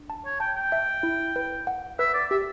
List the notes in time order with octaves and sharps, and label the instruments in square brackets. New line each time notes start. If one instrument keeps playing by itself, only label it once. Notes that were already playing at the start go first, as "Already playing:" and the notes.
Already playing: [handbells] D4
A5
[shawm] C#5
[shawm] G5 [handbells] A5
[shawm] G5
[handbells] E5
E4
B4
F#5
[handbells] B4 [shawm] E5
[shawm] D5
[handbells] G4 [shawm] E5